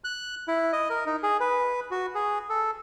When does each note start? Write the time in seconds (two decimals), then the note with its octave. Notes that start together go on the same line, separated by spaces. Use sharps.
0.04 F#6
0.48 E4
0.73 D#5
0.90 A#4
1.06 D#4
1.23 G#4
1.40 B4
1.91 F#4
2.15 G#4
2.49 A4